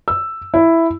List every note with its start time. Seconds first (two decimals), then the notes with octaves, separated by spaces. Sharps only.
0.08 E6
0.54 E4